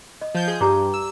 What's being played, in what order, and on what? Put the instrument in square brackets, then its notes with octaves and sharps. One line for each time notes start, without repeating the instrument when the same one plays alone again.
[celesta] D#5
[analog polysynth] F3 G6
G#4
[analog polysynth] G2 [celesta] G4 A#5 D6
[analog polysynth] E6